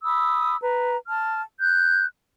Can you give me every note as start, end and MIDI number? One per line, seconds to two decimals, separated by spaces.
0.04 0.57 83
0.04 0.57 87
0.04 0.57 88
0.60 0.96 71
0.60 0.96 82
1.08 1.41 81
1.08 1.41 89
1.60 2.05 90
1.60 2.05 91